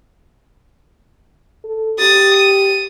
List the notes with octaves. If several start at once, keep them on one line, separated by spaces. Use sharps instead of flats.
A4
G4 D#6 A6
D#7